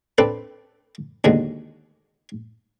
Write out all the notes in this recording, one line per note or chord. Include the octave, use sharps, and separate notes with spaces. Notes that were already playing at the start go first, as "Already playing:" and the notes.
C4 D4 A4 B4
D#2 B2 D3 G#3